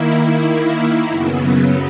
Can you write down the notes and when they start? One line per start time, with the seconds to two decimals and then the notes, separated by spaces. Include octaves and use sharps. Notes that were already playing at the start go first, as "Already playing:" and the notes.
Already playing: D#3 A#3 E4
1.09 F#2 C#3 F#3 B3